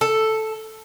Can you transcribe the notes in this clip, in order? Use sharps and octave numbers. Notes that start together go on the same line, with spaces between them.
A4